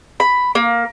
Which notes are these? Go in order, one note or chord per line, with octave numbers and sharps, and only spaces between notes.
B5
A#3